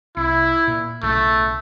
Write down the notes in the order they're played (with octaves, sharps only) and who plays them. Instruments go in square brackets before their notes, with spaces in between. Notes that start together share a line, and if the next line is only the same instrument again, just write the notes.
[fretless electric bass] C2 [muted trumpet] E4
[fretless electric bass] A#2
[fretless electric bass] B1 A2 C#3 [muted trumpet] A3